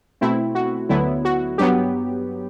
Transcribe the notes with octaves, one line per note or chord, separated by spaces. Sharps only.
B2 A3 C4 E4
F#4
D2 D3 F#3 B3 E4
F#4
G2 F#3 B3 G4